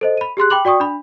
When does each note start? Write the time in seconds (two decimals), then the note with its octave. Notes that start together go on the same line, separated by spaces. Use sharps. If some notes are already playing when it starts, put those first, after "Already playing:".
0.01 A4 C5 D#5
0.17 B5 D#7
0.37 G4 G#4 C6 F#6
0.50 G5 B5 D6 F#7
0.65 F#4 D5 G5 C#6 D#6
0.80 D4 B5